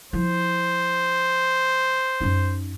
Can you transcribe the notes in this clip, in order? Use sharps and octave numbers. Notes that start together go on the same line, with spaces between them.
F3 E4 C5
F#2 D#4